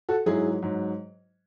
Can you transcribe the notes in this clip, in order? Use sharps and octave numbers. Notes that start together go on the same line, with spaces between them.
F#4 A4
G#2 F#3 E4 G#4
G#2 F#3